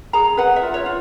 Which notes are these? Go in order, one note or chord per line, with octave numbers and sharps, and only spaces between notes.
G#4 A#5
B4 F#5
E5
F4
C#5
F4